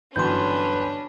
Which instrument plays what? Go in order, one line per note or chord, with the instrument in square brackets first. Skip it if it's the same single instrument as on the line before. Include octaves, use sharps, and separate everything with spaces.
[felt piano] G1 E3 F#3 [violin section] C#4 D4 [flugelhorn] B4 [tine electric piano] C6 G6